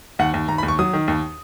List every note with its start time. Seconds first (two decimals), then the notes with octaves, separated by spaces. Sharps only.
0.19 D#2 F#5
0.34 D#2
0.48 D#2 A#5
0.58 B5
0.63 D#2
0.68 C#6
0.79 F#3 D#6
0.93 D#3
1.08 D#2